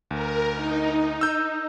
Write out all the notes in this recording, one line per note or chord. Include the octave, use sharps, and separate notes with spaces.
D2 A#4
D#4
E6 G6